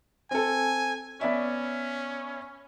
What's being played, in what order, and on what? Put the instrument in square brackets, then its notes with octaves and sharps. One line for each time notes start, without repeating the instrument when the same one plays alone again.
[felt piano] C4 A4 [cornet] G#5
[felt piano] B3 D5 E5 [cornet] C#4